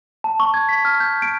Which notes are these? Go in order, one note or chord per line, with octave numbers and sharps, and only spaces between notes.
A5
C#6
G#6
B6
F6
G6
D7